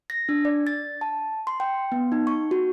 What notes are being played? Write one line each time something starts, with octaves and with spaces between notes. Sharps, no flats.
A#6
D4
D5
A6
A5
C6
G5
B3
D#4
C#6
F#4